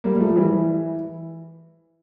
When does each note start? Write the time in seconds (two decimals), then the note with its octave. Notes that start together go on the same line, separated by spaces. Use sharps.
0.04 G3 A#3
0.16 G3
0.20 F3 A3
0.36 E3 G3
0.51 E3